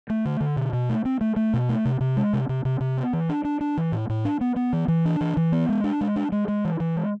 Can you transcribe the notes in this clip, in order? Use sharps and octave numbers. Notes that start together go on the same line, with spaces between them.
A3
D3
D3
B2
B2
A3
C4
A3
A3
B2
A3
C3
C3
G#3
C3
C3
C3
C3
B3
E3
D4
D4
D4
E3
A2
A2
D4
B3
B3
E3
E3
D4
E3
E3
B3
G#3
D4
G#3
D4
G#3
G#3
E3
E3
G#3